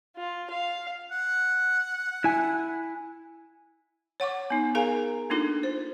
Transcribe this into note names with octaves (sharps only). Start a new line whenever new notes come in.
F4
F5
F#5
E4 G#5
C#5 F#5 C#6 D6
B3 D#4
G#4 A#4 F5 G#5 A#5
A#3 D4 D#4 F4 A4
C5